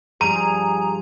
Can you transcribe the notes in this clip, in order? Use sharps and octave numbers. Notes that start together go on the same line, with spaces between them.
G2 F3 G#4 A#5 D#7